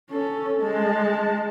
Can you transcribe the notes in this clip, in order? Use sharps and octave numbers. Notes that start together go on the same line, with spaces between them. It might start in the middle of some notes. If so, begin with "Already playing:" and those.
C#4 A4
G#3 A5